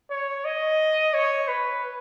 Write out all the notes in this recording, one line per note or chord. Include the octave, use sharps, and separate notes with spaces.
C#5
D#5
C#5
B4